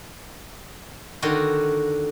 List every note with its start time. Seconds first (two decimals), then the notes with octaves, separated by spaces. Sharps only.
1.22 D3 D#3 F#4 C6